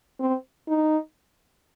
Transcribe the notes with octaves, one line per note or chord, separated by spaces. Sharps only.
C4
D#4